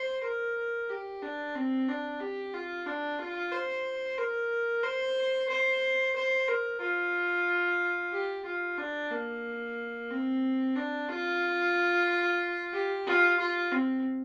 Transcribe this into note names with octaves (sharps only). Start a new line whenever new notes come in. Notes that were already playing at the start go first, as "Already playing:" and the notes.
Already playing: C5
A#4
G4
D4
C4
D4
G4
F4
D4
F4
C5
A#4
C5
C5
C5
A#4
F4
G4
F4
D4
A#3
C4
D4
F4
G4
F4
F4
C4